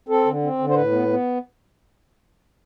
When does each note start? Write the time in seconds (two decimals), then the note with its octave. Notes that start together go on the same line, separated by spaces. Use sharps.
0.09 C4 A4
0.26 D3
0.42 C4
0.59 D3
0.70 C5
0.75 A2 B4
0.92 B3
1.08 B3